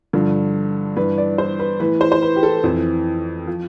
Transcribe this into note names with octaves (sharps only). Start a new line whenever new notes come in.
G2 D3 F3
G2 E3 B4
D5
C5
B4
A2 E3 B4
C5
C5
B4
G4
A4
F2 E3
F3